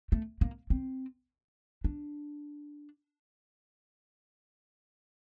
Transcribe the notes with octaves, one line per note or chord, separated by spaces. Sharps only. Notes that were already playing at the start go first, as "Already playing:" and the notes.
A3
A#3
C4
D4